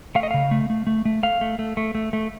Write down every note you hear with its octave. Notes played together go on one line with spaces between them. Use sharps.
A3 F5
D#5
C#3 F5
A3
A3
A3
A3
A3 F5
A3
A3
A3
A3
A3